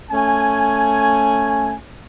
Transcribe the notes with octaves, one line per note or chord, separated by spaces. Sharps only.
A3 C#4 G#5